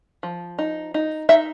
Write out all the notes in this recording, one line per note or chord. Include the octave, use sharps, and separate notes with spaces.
F3
D#4
D#4
D#4 E5